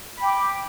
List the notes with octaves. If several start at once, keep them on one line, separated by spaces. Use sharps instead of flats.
G5 B5 D6